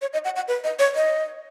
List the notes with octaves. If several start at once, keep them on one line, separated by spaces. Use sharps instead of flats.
C#5
D#5
F#5
F#5
B4
D#5
C#5
D#5